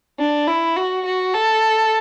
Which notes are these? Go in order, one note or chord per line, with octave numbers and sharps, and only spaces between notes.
D4
E4
F#4
F#4
A4